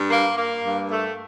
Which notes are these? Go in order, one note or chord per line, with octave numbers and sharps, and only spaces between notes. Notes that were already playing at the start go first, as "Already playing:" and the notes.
Already playing: G2
A#3
A#3
G2
A3